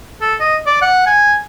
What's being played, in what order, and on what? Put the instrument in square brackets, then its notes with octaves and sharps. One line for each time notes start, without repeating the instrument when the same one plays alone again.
[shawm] A4
D#5
D5
F#5
G#5